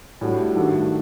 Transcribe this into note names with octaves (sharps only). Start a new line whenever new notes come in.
A2 G3 D4 F#4
G2 D#3 A3 D4 F#4